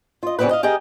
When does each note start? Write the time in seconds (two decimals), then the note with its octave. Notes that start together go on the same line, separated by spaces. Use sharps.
0.23 F4 D#5
0.39 C#3 E3 G3 B3 C4 B4
0.51 D#5 F5
0.63 G4 G#4 A#4 D#5